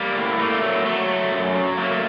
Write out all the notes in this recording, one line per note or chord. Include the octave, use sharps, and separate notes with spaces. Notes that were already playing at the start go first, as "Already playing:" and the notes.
Already playing: G3 A#3
A2
A3 A#3
F#3
F#3 A3
A3
F#2
F#3
A3 A#3